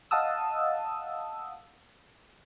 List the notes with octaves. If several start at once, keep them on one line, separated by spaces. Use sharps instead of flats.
D#5 F5 F#5 A5 D#6 E6